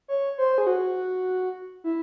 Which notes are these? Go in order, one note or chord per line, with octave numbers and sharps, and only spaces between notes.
C#5
C5
G#4
F#4
E4